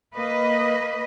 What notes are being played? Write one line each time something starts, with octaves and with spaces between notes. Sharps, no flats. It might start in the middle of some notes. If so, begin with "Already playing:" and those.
A#3 B4 D#5